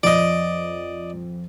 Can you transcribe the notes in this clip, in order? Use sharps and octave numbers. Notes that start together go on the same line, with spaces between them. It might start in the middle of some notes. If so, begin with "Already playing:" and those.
F2 D5 D#5